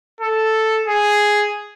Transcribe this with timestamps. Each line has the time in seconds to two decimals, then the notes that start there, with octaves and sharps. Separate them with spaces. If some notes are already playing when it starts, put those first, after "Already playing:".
0.21 A4
0.87 G#4